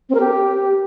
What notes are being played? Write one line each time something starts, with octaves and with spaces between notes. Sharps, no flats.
C4
A#4
G4